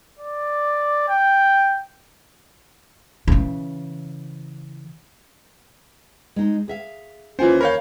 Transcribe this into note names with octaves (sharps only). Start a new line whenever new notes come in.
D5
G5
C#3 E3
G#3 D#4
G#4 E5 F5
D#2 E3 C#4 F4 C5 G#5
A#4 C#5 F5 B5 G6